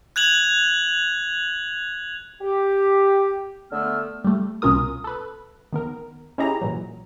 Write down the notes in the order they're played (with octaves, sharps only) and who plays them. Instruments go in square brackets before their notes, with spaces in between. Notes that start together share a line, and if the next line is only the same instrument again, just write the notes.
[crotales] F#6 G#6 F7 F#7
[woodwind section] G4
D3 A3 B3 E6 F6
[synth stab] G3 A3
C2 B2 C#4 F4 A#4 D#6
A4 B4
D#3 B3 A#4
C#4 D#4 E4 G4 G#4 A#5
A#2 E3 F#3